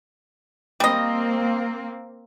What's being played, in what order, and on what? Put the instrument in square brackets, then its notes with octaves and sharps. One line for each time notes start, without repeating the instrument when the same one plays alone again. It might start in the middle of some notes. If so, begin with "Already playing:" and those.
[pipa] G3 D#5 [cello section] A#3 C4